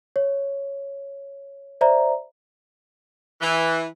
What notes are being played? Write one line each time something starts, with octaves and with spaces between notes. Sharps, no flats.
C#5
C5 D5 E5 A#5
E3